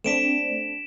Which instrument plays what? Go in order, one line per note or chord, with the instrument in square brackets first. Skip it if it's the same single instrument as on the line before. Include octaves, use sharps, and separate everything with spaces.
[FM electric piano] A3 C4 D4 [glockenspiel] B6 D7 E7